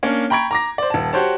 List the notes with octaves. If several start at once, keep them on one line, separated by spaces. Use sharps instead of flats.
A#3 C#4 D4
G5 A#5 B5 C#6 G#6 D7
A#5 D6 A#6
C5 D5
D#1 A5
F#4 G4 C5 C#5 A5